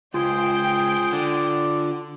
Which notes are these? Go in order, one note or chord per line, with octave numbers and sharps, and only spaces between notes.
C#2 F4 G#4 C5 G5
D3 D5